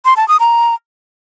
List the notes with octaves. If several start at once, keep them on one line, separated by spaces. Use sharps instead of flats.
C6
A5
D#6
A#5